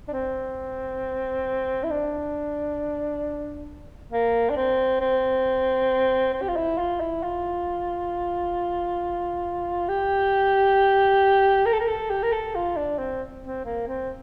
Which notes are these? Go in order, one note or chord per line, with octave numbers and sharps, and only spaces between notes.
D4
C4
E4
D4
A#3
D4
C4
C4
C4
G4
F4
E4
F4
E4
F4
G4
A#4
A4
A#4
A4
G4
A#4
A4
F4
D4
C4
C4
A#3
C4